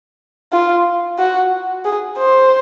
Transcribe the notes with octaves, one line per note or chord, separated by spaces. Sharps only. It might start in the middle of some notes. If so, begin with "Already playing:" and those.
F4
F#4
G#4
C5